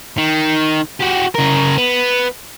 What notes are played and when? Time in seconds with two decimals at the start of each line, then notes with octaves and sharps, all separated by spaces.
0.18 D#3
1.00 F#4 G4
1.35 C#3 A#4
1.78 B3